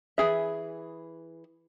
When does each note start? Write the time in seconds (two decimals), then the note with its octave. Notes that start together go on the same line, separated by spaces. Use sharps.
0.18 E3 G#4 E5